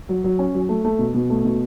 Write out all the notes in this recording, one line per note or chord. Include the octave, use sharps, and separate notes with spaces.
F#3
F#3
C#4
F#3
A3
A3
B2
B2
A3
B2